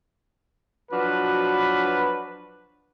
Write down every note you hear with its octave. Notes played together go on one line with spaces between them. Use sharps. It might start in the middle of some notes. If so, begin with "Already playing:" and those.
F3 F#3 D4 F#4 B4